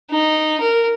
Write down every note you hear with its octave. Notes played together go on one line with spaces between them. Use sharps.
D#4
A#4